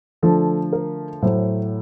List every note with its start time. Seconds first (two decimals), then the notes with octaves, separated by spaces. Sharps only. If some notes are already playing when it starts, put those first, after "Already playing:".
0.23 D3 F3 A3 A4
0.73 A#4
1.22 A2 F#3 A3 C5